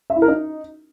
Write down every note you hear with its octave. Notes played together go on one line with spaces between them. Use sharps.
E5
E4
A#4
D#4